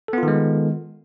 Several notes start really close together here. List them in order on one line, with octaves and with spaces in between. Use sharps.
A4 B3 F4 D#3 G#3